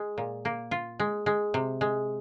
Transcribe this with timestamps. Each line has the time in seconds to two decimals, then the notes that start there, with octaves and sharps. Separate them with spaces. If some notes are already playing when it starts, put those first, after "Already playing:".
Already playing: G#3
0.18 A#2
0.45 A#3
0.71 F4
0.99 G#3
1.26 G#3
1.54 C3
1.81 G#3